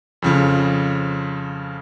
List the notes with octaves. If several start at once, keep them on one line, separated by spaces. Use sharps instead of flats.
F2 C#3 F3